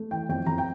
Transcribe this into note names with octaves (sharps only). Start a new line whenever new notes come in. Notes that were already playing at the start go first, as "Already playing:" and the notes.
Already playing: A3
E3 G5
F2 G5
F2 A#5
G5